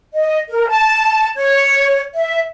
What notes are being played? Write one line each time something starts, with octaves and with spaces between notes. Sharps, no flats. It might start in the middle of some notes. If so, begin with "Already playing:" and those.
D#5
A#4
A5
C#5
E5